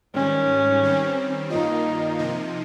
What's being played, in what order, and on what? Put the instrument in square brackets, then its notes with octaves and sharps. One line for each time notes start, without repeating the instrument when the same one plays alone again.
[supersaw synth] G#2 D#3 G3 [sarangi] C#4
[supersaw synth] D#3 G3 C4
[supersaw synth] G2 D#3 A#3 F4 [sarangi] D#4
[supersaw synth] C3 F3 A#3 D#4